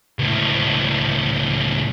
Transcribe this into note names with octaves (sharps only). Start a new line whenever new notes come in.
C#2 A2